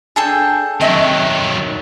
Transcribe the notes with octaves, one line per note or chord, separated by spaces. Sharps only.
D4 G#4 A4 G5
D#3 F#3 C4 D#5 E5